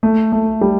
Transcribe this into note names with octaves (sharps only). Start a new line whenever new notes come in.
A3
A3
G3